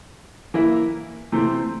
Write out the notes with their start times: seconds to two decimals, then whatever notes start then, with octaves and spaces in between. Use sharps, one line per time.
0.54 E3 A#3 E4 A#4
1.32 C3 E3 A3 C4